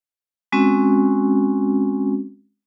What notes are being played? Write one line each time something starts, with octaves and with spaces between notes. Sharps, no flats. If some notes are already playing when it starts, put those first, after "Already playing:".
G#3 C4 C#4 F#4